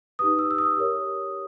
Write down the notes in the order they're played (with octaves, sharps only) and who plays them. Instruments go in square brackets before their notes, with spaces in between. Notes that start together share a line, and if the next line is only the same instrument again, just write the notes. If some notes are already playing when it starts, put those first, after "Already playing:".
[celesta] D#4 G4 B4 D#6
E6
E6
D#6
G4 A#4 C#5